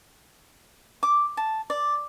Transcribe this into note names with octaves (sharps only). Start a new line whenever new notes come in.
D6
A5
D5